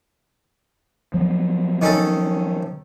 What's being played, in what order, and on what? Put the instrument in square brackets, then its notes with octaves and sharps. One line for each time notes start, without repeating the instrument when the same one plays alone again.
[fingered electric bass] F3 F#3 B3
[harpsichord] D#3 C#4 A4